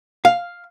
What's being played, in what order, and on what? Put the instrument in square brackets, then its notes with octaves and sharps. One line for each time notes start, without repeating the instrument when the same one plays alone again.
[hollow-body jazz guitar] F5